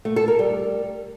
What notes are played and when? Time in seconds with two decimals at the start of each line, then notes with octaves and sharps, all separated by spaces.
0.05 A3
0.16 A4
0.28 A#4
0.39 G3